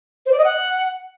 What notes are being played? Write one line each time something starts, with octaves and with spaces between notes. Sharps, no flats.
C5
D5
D#5
F#5